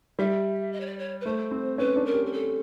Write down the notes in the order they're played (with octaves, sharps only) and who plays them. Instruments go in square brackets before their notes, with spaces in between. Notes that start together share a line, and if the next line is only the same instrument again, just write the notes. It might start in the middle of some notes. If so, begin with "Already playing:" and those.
[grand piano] G3 [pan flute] E5
[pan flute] D#5
C#5
D5
C#5
B4
[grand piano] A3 [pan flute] C5
[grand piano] C4
[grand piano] C#4 [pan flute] B4
[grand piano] D4
[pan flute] A#4
[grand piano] G4
[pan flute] A#4
A4